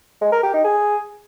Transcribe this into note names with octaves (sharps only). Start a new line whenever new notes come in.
G#3
A#4
G4
D#4
G#4